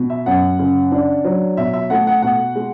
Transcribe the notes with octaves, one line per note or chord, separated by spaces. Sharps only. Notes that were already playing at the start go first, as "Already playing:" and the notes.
Already playing: B2
E5
F#2 F#5
C#3
D4
F#3
B2 E5
E5
A3 F#5
F#5
B2 F#5
G#3